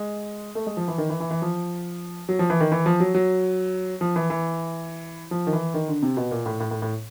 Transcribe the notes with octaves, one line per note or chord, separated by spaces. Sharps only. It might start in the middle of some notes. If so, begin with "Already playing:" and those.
Already playing: G#3
A3
G#3
F3
E3
D#3
E3
E3
E3
F3
F#3
F3
E3
D#3
E3
F3
F#3
F#3
F3
E3
E3
F3
D#3
E3
D#3
D3
C3
B2
A#2
A2
A2
A2
A2